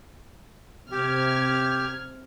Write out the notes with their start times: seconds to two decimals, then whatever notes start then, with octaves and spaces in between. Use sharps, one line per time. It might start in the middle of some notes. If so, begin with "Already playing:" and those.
0.92 C3 G4 F6 G#6